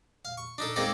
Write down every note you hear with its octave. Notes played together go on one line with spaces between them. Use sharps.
F5
C#6
D4 D#4 A4
G#3 A#3 C4 D#4 A4 D5